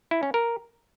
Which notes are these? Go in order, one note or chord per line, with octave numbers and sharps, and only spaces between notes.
E4
C#4
A#4